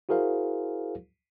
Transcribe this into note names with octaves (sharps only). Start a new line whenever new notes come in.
E4 F#4 G#4 A#4 C5 F5